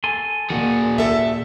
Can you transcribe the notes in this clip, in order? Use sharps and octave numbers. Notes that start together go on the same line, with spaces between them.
A4 G#5 C6
D#2 A#2 F#4 G#4
A4 E5